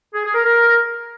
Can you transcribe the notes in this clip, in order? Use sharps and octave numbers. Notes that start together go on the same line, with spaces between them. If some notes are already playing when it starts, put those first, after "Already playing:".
G#4
G#4
A#4
A#4